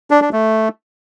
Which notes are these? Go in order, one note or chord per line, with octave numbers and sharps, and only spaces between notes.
D4
D4
A3